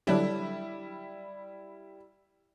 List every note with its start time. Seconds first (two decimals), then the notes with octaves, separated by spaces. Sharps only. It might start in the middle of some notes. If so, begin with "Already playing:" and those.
0.07 D3 F#3 G3 D4 E4